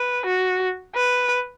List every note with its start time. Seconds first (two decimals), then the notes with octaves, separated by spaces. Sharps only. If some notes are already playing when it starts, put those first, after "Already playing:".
Already playing: B4
0.26 F#4
0.95 B4